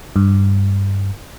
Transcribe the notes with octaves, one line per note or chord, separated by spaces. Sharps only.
G2